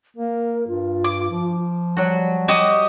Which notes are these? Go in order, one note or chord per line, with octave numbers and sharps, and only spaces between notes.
A#3 A#4
G2 F4
D6
F3
F#3 G3 F#4
F#4 G4 D#5 D#6